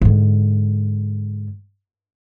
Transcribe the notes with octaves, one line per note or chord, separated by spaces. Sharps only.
G#2 D3